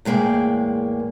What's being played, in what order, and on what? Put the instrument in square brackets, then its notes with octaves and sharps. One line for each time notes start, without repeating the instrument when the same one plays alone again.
[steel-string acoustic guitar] E2 A2 G#3 A#3 G5